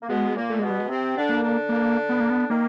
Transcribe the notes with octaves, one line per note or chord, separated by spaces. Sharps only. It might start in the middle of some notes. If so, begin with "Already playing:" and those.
A#3
B2 G#3 B3
A#2 A#3
A3
B2 G#3 B3
G3
G#3
C3 C4
D3 D4
A#3
D3 D4
A#3
B3
A#3
B3
D#3 A#3 D#4